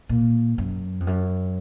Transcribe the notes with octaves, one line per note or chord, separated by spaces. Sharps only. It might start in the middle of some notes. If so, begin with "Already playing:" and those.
A#2
F#2
F2
F#2